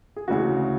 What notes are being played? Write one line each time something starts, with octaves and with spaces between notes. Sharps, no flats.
G#4
D2 C#3 E3 F#4